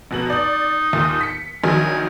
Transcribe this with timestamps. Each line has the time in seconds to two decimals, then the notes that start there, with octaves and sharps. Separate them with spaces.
0.11 F1 B2 F#7
0.30 D#4 D5 F#7
0.93 D#2 A#2
1.21 B6 C#7
1.64 A#1 D#3 F#3 G#5